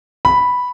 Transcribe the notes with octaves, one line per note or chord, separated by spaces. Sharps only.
B5